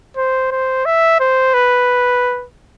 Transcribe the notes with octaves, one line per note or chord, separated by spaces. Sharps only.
C5
C5
E5
C5
B4